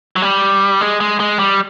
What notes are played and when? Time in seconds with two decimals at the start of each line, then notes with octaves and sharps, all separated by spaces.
0.16 F#3
0.22 G3
0.81 G#3
1.00 G#3
1.20 G#3
1.39 G3